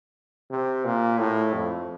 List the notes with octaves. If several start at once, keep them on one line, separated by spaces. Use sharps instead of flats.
C3
A#2
A2
F2